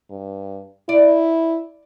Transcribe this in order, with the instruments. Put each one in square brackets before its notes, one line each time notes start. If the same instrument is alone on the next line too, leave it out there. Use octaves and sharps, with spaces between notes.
[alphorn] G2
[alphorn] E4 [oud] D5